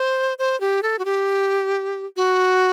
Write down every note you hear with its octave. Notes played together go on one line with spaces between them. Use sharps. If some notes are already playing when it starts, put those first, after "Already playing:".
Already playing: C5
C5
G4
A4
F#4
G4
F#4